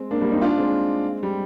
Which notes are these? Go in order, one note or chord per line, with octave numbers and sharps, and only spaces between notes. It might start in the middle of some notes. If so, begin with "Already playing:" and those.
Already playing: G#3 C4
A#3 D4
G3 A#3
C4 D#4
D4 F4
G#3 C4
G3